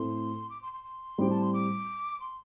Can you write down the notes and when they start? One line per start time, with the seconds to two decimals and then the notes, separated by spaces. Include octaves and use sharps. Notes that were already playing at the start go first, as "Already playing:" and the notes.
Already playing: A2 A3 C4 C6
0.49 D6
0.61 C6
0.72 C6
0.84 C6
1.18 A2 G3 C4 G4 G5
1.30 A5
1.41 C6
1.52 D6
2.19 C6